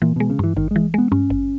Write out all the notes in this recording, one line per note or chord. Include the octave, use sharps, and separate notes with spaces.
A#2 E3
B2 G#3
C#3
G2 E3
G#1 D#3
E3 G#3
G#3 B3
G2 C#4
G#1